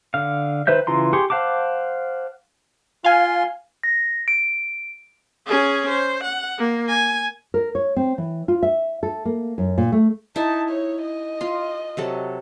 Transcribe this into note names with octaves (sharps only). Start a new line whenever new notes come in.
D3 F5
D#3 B4 C5 E5 G6
C#3 E3 F4 A#5 C6
G4 G#4 C6 C#6
C5 F5 F#5 A5 D6
F4 F5 G#5 C6
A#6
D7
C#4 G#4
C5
F#5
A#3
G#5
A#4
C#5
C4
E3
F4
E5
A4
A#3
F#2
A#2
A3
D#4 E4 A5
C#5
D#5
F4 C6
C3 F#3 A4